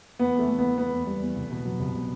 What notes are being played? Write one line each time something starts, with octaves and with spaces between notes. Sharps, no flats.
E2 B3
E2 A3
E2
B3
E2
E2 B3
E2
G3
E2
C2
B2
F#3
C2
B2